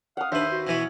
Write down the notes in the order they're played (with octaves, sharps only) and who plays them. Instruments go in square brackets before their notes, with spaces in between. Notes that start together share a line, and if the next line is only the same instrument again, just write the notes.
[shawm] F5 [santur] F#5 D#6
[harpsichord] D#2 B4 [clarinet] D4 [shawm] C5 [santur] E5
[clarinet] F#4
[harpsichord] B2 E3 B4 [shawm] C#4